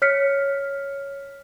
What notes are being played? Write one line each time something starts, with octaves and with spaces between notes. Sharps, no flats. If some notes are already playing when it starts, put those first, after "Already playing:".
C#5 F6 B6 C#7